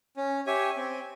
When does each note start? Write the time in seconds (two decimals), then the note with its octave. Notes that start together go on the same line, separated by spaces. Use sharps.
0.17 C#4
0.46 G4 C#5 E5 G#5
0.77 C4